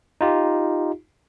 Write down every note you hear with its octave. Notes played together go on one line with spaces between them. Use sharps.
D#4 F4 G4